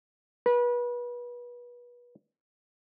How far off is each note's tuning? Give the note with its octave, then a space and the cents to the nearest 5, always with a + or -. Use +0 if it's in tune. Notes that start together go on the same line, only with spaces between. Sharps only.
B4 -30